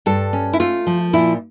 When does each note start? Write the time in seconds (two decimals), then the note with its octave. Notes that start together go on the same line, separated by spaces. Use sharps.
0.06 G2 A4
0.33 C#4
0.53 E4
0.60 A3 F4
0.87 F3
1.13 A#2 E4